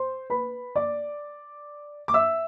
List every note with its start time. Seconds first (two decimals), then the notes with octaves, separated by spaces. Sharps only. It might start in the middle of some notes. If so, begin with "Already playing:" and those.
Already playing: C5 C6
0.30 B4 B5
0.76 D5 D6
2.08 D6
2.14 E5 E6